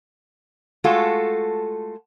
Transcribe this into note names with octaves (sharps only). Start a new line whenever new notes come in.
G#3 A3 F4 F#4 A4